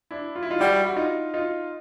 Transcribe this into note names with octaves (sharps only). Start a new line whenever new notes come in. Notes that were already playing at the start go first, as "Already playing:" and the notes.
D4 E4
F4
E4
D#4 F4
G3 E4 F#4
F#4
D#4 F4
D#4 F4